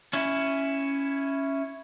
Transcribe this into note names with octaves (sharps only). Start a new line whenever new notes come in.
C#4 E4